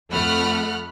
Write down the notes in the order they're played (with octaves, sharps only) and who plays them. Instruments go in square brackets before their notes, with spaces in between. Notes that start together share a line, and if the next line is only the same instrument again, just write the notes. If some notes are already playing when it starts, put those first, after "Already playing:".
[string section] F2 A3 F#5 B5 F6 F#6